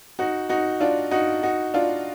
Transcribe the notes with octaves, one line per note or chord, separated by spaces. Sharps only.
D#4 F#4
D#4 F#4
D4 F4
D#4 F#4
D#4 F#4
D4 F4